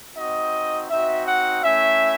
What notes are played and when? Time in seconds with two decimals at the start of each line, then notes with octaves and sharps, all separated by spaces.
0.15 C4 D#4 F#4 D#5
0.90 C4 D#4 F#4 E5
1.26 F#5
1.63 A3 C#4 E4 E5